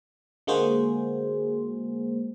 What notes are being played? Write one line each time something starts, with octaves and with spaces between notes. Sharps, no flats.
D3 G#3 A#3 F#4 G#4 C5